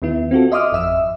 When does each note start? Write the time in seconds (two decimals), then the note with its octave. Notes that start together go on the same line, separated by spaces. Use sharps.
0.02 D#2 D#3 B3 E4
0.31 C4 F4 F#4 A4
0.52 D#5 E5 C6 D6 D#6 F6
0.71 G#1 F2 E5 E6